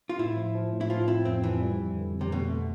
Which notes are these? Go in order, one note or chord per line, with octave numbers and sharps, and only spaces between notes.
F4
A2 E4
F3
F3
A2
E4
F3 F4
C4 E4
F2 C4
E3 F3
G3
F2
D3
F2
C3
B2 A3
A3